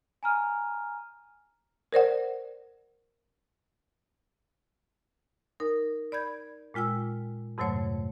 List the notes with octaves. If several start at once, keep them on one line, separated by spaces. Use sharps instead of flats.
G#5 A#5 F6 D#7
A#4 C5 D5 F#5
D#4 A#4
D5 B5 G6 G#6
A#2 G#3 F4 G5 E6
F2 G#2 C3 F#3 A3 C#5